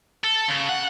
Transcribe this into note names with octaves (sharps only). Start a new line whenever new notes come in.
A4
C#3
F#5